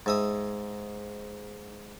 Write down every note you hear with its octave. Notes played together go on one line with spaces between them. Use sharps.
G#2 E5 D#6